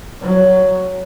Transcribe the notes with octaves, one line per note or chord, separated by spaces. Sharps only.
F#3